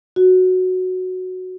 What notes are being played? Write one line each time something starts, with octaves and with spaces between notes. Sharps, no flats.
F#4